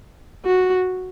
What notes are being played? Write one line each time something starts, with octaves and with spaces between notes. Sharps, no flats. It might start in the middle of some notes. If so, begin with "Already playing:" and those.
F#4